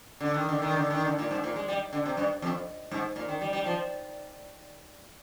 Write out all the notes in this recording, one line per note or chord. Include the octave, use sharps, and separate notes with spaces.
D3
D#3
D3
D#3
D3
D#3
D3
A#2
G#2
A#2
G#3
G3
D3
C3
G2
F2
G#2
A#2
D#3
G3
G3
F3